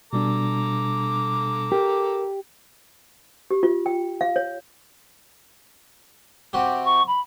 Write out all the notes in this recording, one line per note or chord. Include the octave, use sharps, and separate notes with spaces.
B2 G3 D4 A4 A#5 D6
G4 A#4
G4
F4
G5
F5
C#5
C3 F#4 G4
C#6
B5